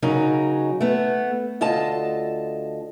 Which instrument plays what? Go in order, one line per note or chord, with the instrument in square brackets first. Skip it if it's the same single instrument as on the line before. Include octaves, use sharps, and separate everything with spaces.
[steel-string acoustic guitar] C#3 F#3 D#4 A#4
A3 B3
D2 F4 A4 D#5 A5